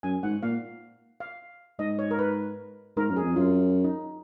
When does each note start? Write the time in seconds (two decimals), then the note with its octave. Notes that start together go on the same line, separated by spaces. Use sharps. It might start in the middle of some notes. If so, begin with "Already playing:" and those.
0.03 F#2 G#5
0.23 G#2 F#5
0.42 A#2 F5
1.20 F5
1.79 G#2 D#5
1.99 C#5
2.11 A#4
2.19 B4
2.97 G#2 A#4
3.10 F#2
3.17 G#4
3.23 F2
3.36 F#2 F4
3.84 D#4